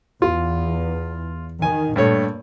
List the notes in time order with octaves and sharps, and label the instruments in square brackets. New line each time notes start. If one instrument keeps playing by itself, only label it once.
[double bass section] E2 [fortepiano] F4
[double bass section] D#3 [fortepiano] G#5
[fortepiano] G2 A3 C#5 [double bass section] A#2